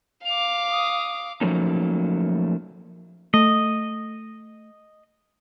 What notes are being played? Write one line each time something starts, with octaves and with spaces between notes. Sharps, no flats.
F5 D6 F7
D#6
F3 F#3 A3 A#3 C#4 D#4
A3 D#5